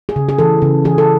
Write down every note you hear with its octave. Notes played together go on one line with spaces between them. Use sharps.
G#4
C#3
G#4
E3 A4
C#3
E3 G#4
A4